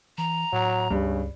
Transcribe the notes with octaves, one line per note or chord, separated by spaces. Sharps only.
E3 A#5
A2 F#3
C#2 G2 C#3